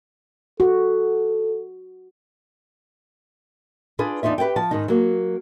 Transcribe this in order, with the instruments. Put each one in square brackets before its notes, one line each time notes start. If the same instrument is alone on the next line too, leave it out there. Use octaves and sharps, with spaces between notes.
[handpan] F#4 [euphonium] A4
[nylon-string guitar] D4 F4 G#4 B4
E2 D4 D#4 F4 E5
G4 B4 C#5 E5 G5
F3 A5
G#2 D#3 D#4
F#3 A#3